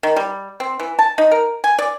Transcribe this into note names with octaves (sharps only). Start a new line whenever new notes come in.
D#3
G3
C4
E3
A5
D#4
A#4
G#5
D5